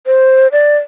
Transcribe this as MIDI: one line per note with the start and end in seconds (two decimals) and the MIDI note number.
0.07 0.48 72
0.52 0.77 74